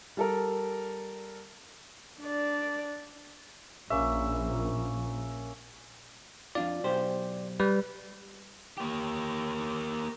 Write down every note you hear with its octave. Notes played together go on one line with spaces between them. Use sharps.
G3 A4 A#4
D4 D5
A#1 A#3 C#4 E5
F2 D4 F4 D5
B1 G4 C5
G3 B4
A#3 G4